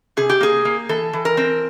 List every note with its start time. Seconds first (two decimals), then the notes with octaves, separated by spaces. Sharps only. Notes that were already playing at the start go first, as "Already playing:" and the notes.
0.17 C3 G#4
0.29 G4
0.41 A#3 G#4
0.65 A#3
0.89 E3 A4
1.13 E3
1.25 A#4
1.37 C4